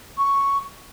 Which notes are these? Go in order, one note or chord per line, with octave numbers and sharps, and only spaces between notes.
C#6